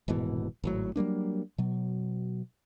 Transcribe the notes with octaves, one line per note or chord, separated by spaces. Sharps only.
D#1 G#2 B2 E3
G#1 A2 F#3
F#3 G3 A#3 D4
B2 F#3